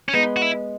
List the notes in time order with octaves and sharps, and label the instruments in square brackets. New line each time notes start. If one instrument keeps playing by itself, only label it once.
[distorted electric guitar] C#4
[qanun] G#3 B3 [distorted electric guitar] D#4
[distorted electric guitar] F#4
E4